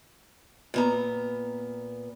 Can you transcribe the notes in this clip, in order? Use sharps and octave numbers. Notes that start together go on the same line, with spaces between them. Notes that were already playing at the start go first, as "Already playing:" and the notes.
A#2 B3 A#5